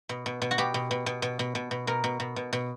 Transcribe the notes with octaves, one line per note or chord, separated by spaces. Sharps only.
B2
B2
B2
F#4
B2 G4
B2
B2
B2
B2
B2
B2
B2
B2 A#4
B2
B2
B2
B2